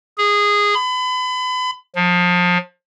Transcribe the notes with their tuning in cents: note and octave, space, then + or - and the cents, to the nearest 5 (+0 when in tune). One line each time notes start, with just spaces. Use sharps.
G#4 -15
B5 +35
F3 +30